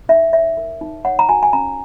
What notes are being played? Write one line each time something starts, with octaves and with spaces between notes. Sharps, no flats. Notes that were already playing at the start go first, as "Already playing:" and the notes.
D#4 E5
C#5 E5
A#4
D#4
C#5 F#5
A#5
F#4 G#5
G#5
C#4 A#5